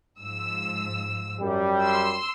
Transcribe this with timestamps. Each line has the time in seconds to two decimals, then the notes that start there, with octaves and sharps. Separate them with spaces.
0.18 G#2 F3 E6
1.41 F#2 G3
1.82 C6 E6